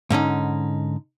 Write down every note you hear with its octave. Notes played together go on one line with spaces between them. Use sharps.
G#2 D3 C#4 D#4